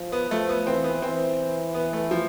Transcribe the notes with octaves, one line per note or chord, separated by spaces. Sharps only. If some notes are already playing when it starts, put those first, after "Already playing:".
Already playing: F3
B3
F3 A3
B3
E3 C4
B3
E3 C4
B3
A3
F3